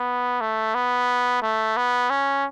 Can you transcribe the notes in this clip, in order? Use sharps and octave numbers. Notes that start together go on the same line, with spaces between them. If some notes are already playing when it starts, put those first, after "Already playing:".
Already playing: B3
A3
B3
A3
B3
C#4